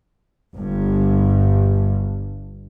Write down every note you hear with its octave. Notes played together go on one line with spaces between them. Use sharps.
G1 G2